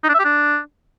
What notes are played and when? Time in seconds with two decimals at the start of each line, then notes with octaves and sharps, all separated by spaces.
0.04 D#4
0.09 D4
0.14 E5
0.19 G4
0.25 D4